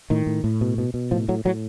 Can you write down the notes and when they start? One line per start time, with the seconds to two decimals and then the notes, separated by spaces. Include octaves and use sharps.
0.10 A2 D#3
0.27 A2
0.44 A2
0.61 B2
0.78 B2
0.94 B2
1.11 A2 F3
1.28 A2 F#3
1.45 A2 F#3